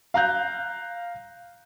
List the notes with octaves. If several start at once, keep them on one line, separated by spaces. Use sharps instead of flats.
F5 A#5 F#6 G6